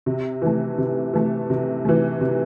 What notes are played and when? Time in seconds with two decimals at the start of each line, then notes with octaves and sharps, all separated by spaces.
0.06 C3
0.42 E3 A3
0.78 C3
1.13 E3 A3
1.50 C3
1.85 E3 A3
2.21 C3